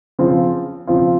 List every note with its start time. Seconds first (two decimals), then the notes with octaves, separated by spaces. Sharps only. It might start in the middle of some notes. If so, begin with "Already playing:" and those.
0.19 C#3 F3 C4 F4
0.87 C#3 F3 C4 F4